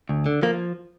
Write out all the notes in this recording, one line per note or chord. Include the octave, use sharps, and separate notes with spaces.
D2
D3
F3 A#3